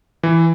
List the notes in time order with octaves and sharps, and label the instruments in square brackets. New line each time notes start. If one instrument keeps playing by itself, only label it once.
[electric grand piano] E3